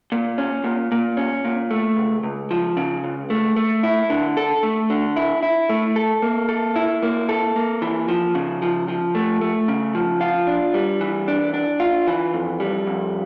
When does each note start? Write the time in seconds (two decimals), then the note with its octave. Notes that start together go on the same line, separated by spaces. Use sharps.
0.12 A#2
0.38 C#4
0.64 A#2
0.92 A#2
1.17 C#4
1.44 A#2
1.71 A3
1.97 C#2
2.23 C#2
2.51 F3
2.77 C#3
3.04 C#2
3.30 A3
3.56 A3
3.83 E4
4.10 D3
4.37 A4
4.63 A3
4.90 D3
5.16 E4
5.43 E4
5.69 A3
5.96 A4
6.22 A#3
6.49 A4
6.76 E4
7.03 A#3
7.29 A4
7.56 A#3
7.82 E3
8.08 F3
8.35 C#3
8.62 F3
8.88 F3
9.15 A3
9.41 A3
9.68 C#3
9.95 F3
10.21 F4
10.47 D4
10.74 G3
11.01 E3
11.28 D4
11.54 D4
11.80 F4
12.08 E3
12.34 F2
12.60 G3
12.87 F2